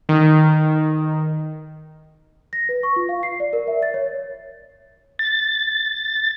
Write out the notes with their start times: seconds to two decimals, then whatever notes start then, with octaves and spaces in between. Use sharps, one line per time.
0.09 D#3
2.53 A#6
2.69 B4
2.83 C#6
2.96 F4
3.09 F5
3.23 C7
3.40 D5
3.53 A#4
3.67 E5
3.83 A6
3.94 C#5
5.19 A6